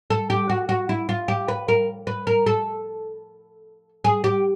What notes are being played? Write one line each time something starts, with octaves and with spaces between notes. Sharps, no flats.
A4
G4
F#4
F#4
E4
F4
G4
B4
A#4
B4
A#4
A4
G#4
G4